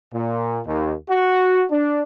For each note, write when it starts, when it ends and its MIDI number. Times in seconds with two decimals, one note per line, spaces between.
0.13 0.59 46
0.67 0.93 39
1.09 1.64 66
1.71 2.02 62